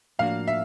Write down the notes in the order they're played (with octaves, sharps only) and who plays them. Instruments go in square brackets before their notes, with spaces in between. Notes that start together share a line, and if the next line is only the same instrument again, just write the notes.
[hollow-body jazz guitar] A2 F3 A#3 D4 F#4 [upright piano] F5
[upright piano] E5